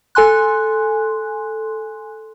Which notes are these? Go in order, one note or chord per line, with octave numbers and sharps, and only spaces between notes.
A4 G#5 C6 F#6